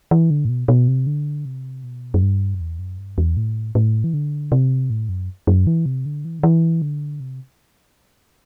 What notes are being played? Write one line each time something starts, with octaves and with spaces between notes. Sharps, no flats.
E3
D3
A2
B2
B2
C3
D3
C3
B2
F#2
G2
F#2
E2
F#2
G2
E2
A2
A2
E3
D3
C3
A2
F#2
F#2
E3
C3
D3
E3
D3
E3
D3
C3